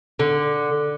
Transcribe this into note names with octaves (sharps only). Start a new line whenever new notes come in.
D3